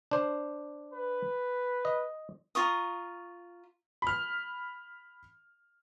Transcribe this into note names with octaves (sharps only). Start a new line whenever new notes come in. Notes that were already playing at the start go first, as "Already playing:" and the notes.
D4 C5
B4
D#5
F4 A#5 C#6 D#6
B5 F6